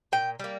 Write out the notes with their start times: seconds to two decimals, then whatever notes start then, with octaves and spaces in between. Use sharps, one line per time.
0.12 A#2 G5
0.39 G3 A#3